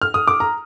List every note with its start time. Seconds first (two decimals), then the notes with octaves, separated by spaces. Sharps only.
0.02 F6
0.14 D#6
0.28 D6
0.40 A#5